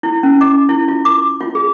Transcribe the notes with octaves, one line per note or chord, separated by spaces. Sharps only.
E4
C#4
D6
E4
F4
D6
F4
G#4